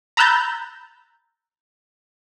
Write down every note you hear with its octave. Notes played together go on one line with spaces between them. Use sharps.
A#5 B5 E6 F#6 G6 A6